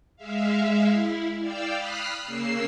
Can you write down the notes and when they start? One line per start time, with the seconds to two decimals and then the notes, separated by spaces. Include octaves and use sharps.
0.16 G#3 E5 F5
0.87 E4
1.40 D5 F5 G5 E6
1.75 B5 D#6 F6 F#6 B6 C7
2.25 C#3 A#3 E6 C7